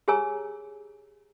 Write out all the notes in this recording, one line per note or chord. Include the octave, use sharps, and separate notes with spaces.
G4 G#4 C#5 G#5 A#5 E6